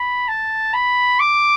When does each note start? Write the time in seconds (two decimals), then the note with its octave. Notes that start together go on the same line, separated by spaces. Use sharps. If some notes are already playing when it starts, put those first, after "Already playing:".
Already playing: B5
0.28 A5
0.74 B5
1.19 D6